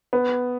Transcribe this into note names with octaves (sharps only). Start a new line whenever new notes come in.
B3